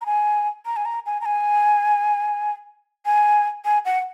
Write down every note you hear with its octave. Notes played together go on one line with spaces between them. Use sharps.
A#5
G#5
A#5
G#5
A#5
G#5
A#5
G#5
G#5
G#5
F#5